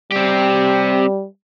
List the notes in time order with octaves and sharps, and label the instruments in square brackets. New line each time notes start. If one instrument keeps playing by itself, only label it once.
[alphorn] G3 [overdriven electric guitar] C4 G4